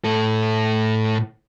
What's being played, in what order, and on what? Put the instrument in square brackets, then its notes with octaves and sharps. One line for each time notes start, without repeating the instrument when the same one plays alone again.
[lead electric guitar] A2 A4